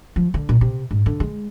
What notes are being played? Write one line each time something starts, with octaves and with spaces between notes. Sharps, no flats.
F3
D3
A#2
C3
G#2
D3
G#3